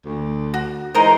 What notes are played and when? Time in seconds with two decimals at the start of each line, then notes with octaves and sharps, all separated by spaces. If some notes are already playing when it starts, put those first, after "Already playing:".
0.05 D2
0.54 F#4
0.95 E3 G#3 D#4 A#4 C5